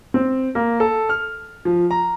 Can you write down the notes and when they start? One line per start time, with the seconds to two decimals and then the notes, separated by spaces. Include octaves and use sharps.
0.14 C4
0.55 A#3
0.80 A4
1.09 F6
1.65 F3
1.91 A#5